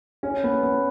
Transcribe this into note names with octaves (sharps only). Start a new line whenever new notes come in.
C#4
B3
B3